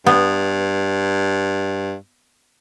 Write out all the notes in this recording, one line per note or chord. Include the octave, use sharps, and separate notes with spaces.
G2 B3